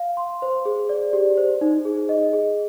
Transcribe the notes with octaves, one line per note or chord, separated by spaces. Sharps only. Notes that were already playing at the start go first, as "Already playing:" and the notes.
Already playing: F5
C6
C5
G#4
D5
G4
C5
D#4
G#4
D#5
G#4